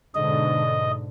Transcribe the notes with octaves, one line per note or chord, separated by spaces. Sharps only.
G#2 B2 D3 D#5